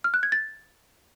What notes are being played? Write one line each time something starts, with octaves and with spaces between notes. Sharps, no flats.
F6
F#6
G#6
A6